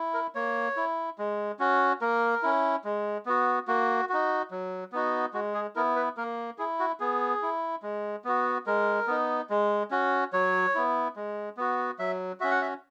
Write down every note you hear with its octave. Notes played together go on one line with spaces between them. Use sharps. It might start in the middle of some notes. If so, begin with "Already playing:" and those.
Already playing: E4
A#4
A#3 C#5
E4
G#3
C#4 F#4
A#3 A#4
C#4 E4
G#3
B3 F#4
A#3 F#4
D#4 F#4
F#3
B3 D#4 F#4
G#3 F#4
G#4
B3 E4 A#4
B4
A#3 A#4
E4 G#4
F#4
B3 G#4
E4
G#3
B3 F#4
G#3 A#4
B3 D#4
G#3
C#4 F#4
F#3 C#5
B3 E4
G#3
B3 F#4
F#3 E5
C#4 F#4 E5
F#5
E5